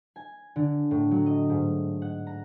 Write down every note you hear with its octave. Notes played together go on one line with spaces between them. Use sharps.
G#5
D3
A2
F#3
D#5
G#2
F#5
A#5